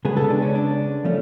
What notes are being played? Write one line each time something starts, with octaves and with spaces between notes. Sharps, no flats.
C#3 G#3 B3 G#4
A4
D4
C#4
D4
F3 A3 C#4